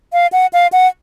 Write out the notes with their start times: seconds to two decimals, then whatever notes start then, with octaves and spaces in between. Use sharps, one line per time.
0.13 F5
0.32 F#5
0.53 F5
0.72 F#5